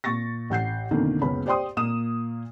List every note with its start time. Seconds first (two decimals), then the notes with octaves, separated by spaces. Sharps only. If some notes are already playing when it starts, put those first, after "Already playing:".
0.04 A#2 C#6 A6 A#6
0.50 A1 F#5 G6 C7
0.91 F2 B2 D3 D#3 A#3
1.21 F#1 C#2 B3 C#4 B5
1.46 G4 C5 D5 G5 C6 D#6
1.77 A#2 A#3 D#6 E7